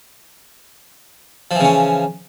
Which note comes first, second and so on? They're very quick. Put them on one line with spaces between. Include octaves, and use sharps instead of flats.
F3 E3 C#3 C#4